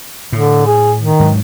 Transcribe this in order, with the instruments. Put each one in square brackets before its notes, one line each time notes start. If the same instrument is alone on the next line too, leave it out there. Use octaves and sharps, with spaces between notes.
[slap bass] A2 [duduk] D3
[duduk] G#4
D#3
[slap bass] G#2 F#3